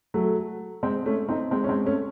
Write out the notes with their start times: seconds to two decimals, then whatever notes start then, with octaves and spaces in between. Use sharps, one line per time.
0.14 F#3 A3
0.83 G#3 C4
1.06 A3 C#4
1.29 C4 D#4
1.51 G#3 C4
1.64 C#4
1.69 G#3 C4
1.86 A3 C#4